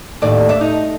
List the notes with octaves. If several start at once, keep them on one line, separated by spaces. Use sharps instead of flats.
D#2 A2 D5
D4 E5
D#4